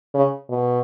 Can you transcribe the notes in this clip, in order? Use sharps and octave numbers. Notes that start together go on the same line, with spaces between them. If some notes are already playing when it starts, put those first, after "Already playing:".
C#3
B2